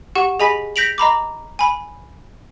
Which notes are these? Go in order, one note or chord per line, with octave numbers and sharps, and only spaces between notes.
G4 F#5 C#6
G#4 D#5 G#5 B5 B6
G6 A#6 B6 D7 F7 F#7
D#5 A#5 B5 D6
G#5 B5